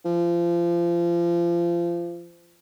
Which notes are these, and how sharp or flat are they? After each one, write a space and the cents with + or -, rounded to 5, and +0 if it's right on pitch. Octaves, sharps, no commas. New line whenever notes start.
F3 -30